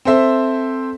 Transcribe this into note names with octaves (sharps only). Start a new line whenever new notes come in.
C4 A4 C5 E5